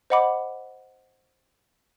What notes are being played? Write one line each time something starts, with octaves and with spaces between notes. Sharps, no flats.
C5 D#5 F#5 B5 D6